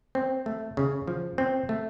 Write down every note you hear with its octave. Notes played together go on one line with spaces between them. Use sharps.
C4
A3
C#3
F3
C4
A3